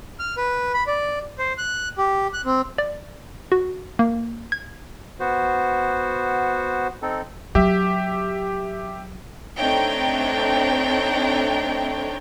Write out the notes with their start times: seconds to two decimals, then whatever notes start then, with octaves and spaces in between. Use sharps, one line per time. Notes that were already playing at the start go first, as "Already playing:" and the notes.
0.20 F6
0.37 B4
0.74 B5
0.87 D5
1.39 C5
1.58 F#6
1.98 G4
2.33 F#6
2.45 C4
2.78 D5
3.52 F#4
3.99 A#3
4.52 G#6
5.20 B3 F#4 C5
7.02 C4 D#4 A4
7.55 F#3 G4 E5
9.57 A3 C4 D4 D#4 C#5 G5